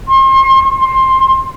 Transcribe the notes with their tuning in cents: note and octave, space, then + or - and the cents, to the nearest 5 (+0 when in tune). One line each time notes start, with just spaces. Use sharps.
C6 +40
C6 +15